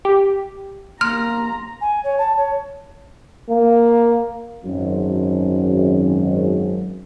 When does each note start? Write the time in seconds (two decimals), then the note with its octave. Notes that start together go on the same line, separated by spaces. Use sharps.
0.05 G4
1.01 A#3 A#5 C6 F6
1.81 G#5
2.03 C#5
2.18 A5
2.36 C#5
3.49 A#3
4.64 G#1 F#2